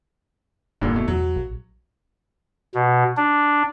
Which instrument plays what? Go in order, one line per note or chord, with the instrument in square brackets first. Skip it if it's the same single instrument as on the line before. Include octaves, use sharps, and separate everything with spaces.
[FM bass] E1 [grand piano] G2 A#2 D3
[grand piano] B2 A3
[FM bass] E2 [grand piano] F#3
[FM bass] A#1
[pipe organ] B2
D4